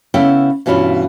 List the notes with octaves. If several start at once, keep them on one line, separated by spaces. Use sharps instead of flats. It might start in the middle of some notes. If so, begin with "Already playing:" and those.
C#3 B3 E4 A4 G5
G2 B2 E3 C#4 E4 F4